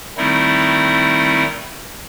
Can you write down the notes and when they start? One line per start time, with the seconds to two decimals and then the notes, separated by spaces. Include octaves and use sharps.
0.17 D#3 G3 A3 C4 D#4 E4